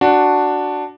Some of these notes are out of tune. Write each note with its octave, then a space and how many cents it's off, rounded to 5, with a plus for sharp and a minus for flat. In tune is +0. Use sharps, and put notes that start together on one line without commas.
D4 +0 F#4 +0